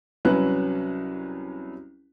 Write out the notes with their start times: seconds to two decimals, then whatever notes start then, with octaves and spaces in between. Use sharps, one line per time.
0.25 C2 F#3 C#4 B4 F#6